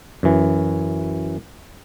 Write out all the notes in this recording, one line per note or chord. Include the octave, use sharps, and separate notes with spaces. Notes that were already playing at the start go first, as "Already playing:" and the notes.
F#2 E3